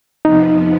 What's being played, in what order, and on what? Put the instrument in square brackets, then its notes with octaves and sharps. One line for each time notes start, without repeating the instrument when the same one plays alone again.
[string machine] F2 C3 F3 B3 [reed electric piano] D#4